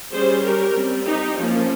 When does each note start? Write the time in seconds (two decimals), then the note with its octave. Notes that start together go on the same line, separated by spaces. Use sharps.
0.12 G3 C#4 G#4 C5
0.43 G4 A#4
0.75 G3 C4
1.06 D#4 G4
1.37 F3 A#3 C#4